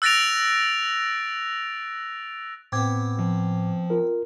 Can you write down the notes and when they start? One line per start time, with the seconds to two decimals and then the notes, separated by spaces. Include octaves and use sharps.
0.02 E6 F#6 A6 A#6 D7 F7
2.72 A2 B3 C4 D6 G#6
3.19 F3
3.90 F4 A#4